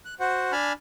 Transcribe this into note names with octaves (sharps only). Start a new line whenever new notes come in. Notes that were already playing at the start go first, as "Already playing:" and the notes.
F#6
F#4 C5 F#5
D4 G#5 A5 B5 F6